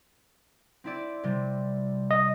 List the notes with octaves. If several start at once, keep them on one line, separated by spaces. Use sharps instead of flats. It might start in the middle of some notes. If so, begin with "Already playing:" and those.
C4 E4 D5
C3 G3
D#5